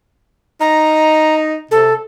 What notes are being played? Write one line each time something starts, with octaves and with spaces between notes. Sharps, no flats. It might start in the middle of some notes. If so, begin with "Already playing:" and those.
D#4 A#5
C3 A4